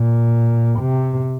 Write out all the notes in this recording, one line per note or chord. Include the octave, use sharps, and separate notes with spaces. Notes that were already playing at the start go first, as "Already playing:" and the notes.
Already playing: A#2
C3